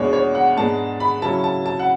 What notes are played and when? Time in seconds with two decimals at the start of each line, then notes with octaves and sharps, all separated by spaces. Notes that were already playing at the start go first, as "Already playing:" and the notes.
Already playing: E2 B2 G#3 D4 C#5
0.13 C#5
0.35 F#5
0.57 G#2 G#3 B3 D4 A5
1.00 B5
1.22 C#3 F#3 C#4 E4 A5
1.44 A5
1.66 A5
1.79 F#5